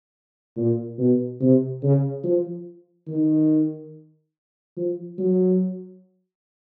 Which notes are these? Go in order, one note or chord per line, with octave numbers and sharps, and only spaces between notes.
A#2
B2
C3
C#3
F3
D#3
F3
F#3